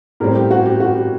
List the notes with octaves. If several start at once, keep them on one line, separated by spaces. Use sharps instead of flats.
A2 G3 C4 A#4
G4
F#4
G4
F#4
G4